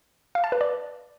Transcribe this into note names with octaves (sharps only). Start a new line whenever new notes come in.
F5
A5
B4
D5